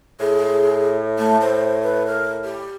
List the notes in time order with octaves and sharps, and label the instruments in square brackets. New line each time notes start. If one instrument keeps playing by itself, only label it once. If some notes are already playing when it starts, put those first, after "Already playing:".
[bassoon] A2 [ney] G#4
[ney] A3
C5
B4
A#4
G4